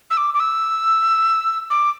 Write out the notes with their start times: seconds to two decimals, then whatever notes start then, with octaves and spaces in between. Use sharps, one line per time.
0.10 E6
0.17 D6
0.34 D6
0.40 E6
1.70 D6